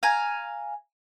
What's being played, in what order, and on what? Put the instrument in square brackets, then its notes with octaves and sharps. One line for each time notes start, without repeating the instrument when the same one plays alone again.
[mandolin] F5 G#5 A#5